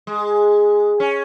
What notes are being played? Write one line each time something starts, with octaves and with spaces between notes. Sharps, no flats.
G#3
C#4